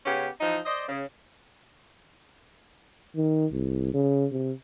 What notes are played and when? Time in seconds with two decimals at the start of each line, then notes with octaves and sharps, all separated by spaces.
0.06 C#3 B3 C#4 G4
0.41 E3 F3 D#4
0.66 C5 D5 D#5
0.88 C#3
3.16 D#3
3.52 C2
3.94 C#3
4.32 C3